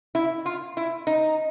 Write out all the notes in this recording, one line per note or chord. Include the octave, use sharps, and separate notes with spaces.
E4
F4
E4
D#4